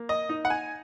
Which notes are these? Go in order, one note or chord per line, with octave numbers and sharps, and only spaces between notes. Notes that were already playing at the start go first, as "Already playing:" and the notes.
Already playing: A#3
D#5
D#4
F#5
G#5